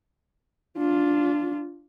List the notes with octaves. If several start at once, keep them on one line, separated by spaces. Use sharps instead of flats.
D4 F4